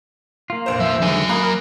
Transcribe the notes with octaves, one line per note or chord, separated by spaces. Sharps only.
A#3 F4
F1 A#1 C5
F3 E5
D3 D#3 F#3 G#3 G#5
A#3 A#5 B5 D#6 F#6
A#4